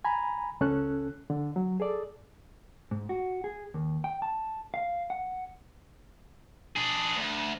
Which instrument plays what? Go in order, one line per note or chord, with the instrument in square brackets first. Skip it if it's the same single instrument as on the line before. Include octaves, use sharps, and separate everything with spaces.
[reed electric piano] G#5 A#5 B5
C#2 C#4 A4 F#6
D3
F#3
G#4 A4 D5
[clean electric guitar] G#2
F#4
G#4
D#2
G5
A5
F5
F#5
[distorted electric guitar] D4 G#4
D2